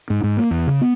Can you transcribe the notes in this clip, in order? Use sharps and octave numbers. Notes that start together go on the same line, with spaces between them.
G#2
G#2
A#3
E2
C#3
B3